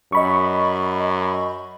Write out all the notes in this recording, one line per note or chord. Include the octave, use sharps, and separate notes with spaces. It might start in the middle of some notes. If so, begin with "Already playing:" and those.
F#2 D#5 B5 C#6